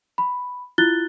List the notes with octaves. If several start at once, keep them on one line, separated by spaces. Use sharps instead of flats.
B5
E4 F4 F#6 A6 G7